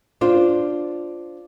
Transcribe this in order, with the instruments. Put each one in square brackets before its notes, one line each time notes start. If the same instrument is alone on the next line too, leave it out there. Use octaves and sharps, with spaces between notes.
[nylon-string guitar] D4 F4 C5